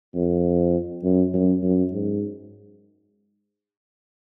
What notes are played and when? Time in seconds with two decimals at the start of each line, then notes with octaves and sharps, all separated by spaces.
0.15 F2
1.04 F#2
1.34 F#2
1.63 F#2
1.92 G#2